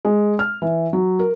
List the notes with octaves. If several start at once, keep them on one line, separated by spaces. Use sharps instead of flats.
G#3
F6
E3
F#3
A#4